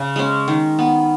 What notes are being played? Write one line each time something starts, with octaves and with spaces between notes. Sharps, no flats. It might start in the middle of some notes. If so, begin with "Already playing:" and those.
Already playing: C#3
G#3 C#4
D#3
B3